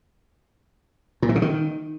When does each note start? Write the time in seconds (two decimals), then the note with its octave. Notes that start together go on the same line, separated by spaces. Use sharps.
1.22 A#2
1.29 E3
1.35 C#3
1.42 D#3